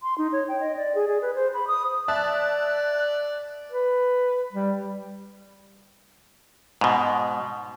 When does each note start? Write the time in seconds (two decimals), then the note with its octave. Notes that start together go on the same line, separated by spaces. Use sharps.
0.03 C6
0.18 D#4
0.32 C#5
0.48 G5
0.60 D#5
0.77 D5
0.95 G#4
1.08 G#4
1.22 B4
1.35 C5
1.54 B5
1.68 D#6
2.08 D5 E5 A5 F#6
3.70 B4
4.53 G3
6.81 G#2 B2